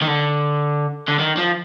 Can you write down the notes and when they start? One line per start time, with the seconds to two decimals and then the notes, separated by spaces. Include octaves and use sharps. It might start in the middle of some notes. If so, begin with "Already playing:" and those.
0.02 D#3
0.07 D3
1.08 D3
1.19 D#3
1.37 F3